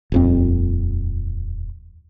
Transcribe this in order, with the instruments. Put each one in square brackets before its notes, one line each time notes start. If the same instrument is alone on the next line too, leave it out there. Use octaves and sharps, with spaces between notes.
[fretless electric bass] D#1 F2 C4